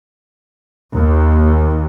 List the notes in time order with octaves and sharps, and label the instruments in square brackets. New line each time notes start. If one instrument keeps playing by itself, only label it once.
[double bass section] D#2